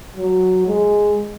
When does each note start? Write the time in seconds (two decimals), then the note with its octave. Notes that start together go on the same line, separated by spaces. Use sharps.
0.16 F#3
0.67 G#3